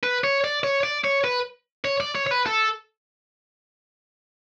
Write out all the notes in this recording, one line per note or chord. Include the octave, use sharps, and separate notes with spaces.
B4
C#5
D5
C#5
D5
C#5
B4
C#5
D5
C#5
C#5
B4
A4